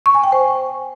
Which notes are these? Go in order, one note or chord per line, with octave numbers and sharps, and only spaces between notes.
C#6
G#5
G5
C5